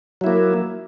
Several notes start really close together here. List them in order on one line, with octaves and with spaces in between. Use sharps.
F#3 E4 A#3